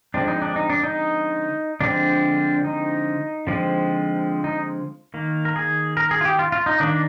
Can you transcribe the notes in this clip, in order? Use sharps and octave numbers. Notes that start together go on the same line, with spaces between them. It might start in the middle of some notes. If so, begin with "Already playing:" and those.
D3 F3 G#3 C4 D4
D#4
D4
D#4
D4
D#4
D3 F3 G#3 C4 D4
D#4
D3 F3 G#3 C4
D#4
D#3 A#3
A#4
G#4
A#4
G#4
F4
G4
F4
F4
D#4
D#3 A#3 D4